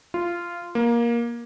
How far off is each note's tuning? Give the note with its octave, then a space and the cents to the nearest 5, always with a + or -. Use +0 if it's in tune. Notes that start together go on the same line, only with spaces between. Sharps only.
F4 -15
A#3 +15